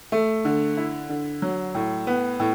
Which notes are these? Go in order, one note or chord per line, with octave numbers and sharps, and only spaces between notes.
A3
D3
E4
D3
F#3
A2
B3
A2